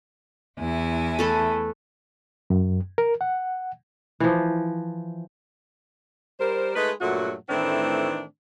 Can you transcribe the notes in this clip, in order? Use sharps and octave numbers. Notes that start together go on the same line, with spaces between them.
E2 E4 G#5
A3 A4 B4
F#2
A#4
F#5
E3 F3
G3 A#4 C5
G#3 A3 D#4 B4
G2 A#2 F#3 A3 F#4
A2 D#3 E3 A3 C4 D4